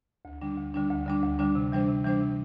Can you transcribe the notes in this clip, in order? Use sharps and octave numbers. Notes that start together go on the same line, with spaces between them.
D2
D3 G3 D4
D2
D3 G3 D4
D2
D3 G3 D4
D2
D3 G3 D4
C3
E3 G3 D4 C5
C3
E3 G3 D4 C5
C3